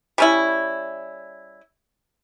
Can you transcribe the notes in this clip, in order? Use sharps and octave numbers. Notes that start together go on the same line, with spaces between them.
G3 C#4 E4